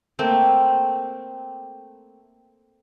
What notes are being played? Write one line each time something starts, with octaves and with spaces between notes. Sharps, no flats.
A3 A#3 C4